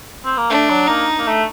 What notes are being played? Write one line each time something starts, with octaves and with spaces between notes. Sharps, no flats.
C4
A#3
A3 D4
F#3
A#3 D#4
A#3
A3